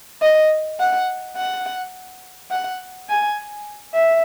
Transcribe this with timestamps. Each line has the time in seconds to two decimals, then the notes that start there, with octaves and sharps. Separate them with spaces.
0.22 D#5
0.80 F#5
1.37 F#5
2.51 F#5
3.09 G#5
3.94 E5